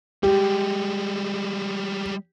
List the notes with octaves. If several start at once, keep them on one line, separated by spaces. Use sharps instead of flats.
G3 G#3 G4